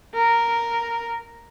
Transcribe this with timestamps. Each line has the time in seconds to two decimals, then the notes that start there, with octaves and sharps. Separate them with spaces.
0.14 A#4